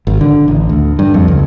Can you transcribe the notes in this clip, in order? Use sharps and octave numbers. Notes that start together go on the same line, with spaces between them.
G#1
D3
A1
D2
G2
F2
C#2